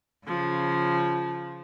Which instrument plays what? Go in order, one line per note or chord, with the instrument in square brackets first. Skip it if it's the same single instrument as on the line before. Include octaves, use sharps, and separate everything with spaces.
[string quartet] C#3 F3